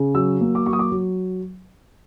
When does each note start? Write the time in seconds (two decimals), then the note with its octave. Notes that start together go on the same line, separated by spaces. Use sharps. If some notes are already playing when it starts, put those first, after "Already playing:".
Already playing: C#3
0.15 F#3 E6
0.41 A#3
0.55 D6
0.66 F#3 C#6
0.73 D#6
0.79 D6
0.92 F#3